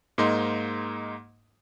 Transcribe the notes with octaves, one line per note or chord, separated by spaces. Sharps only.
G#2 A#3 D#4 C6